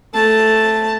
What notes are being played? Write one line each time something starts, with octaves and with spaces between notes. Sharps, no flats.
A3 A5